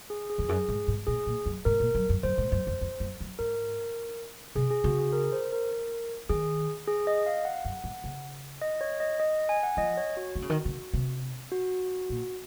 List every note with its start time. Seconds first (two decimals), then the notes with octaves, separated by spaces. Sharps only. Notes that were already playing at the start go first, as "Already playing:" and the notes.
0.10 G#4
0.30 G#4
0.38 F2
0.49 F#2 G#4
0.68 G#2
0.88 G#2
1.07 A#2 G#4
1.26 A#2
1.46 F#2
1.65 G#2 A#4
1.80 A#2
1.95 F#2
2.09 F#2
2.23 F#2 C5
2.38 G#2
2.52 F#2
2.67 F2
2.81 F2
3.00 F#2
3.21 F#2
3.39 G#2 A#4
4.55 C3 G#4
4.70 G#4
4.84 C#3 F#4
4.99 G#4
5.13 A#4
5.32 C5
5.53 A#4
5.71 A#4
6.29 D#3 G#4
6.88 G#4
7.07 D#5
7.26 F5
7.45 F#5
7.65 F#2
7.84 G#2
8.04 C#3
8.62 D#5
8.81 C#5
9.00 D#5
9.20 D#5
9.49 G#5
9.63 F#5
9.77 F3 D#5
9.97 C#5
10.17 F#4
10.36 D#3
10.42 C#3
10.50 D#3
10.65 C#3
10.93 C3
11.52 F#4
12.10 A#2